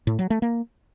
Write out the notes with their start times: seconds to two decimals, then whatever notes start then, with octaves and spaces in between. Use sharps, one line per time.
0.07 A2
0.19 F#3
0.30 A3
0.42 A#3